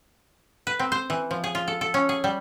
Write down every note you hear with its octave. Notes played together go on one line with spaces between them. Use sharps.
B4
C4
C5
E3
F3
G#4
F4
A4
A4
C#4
G#4
G3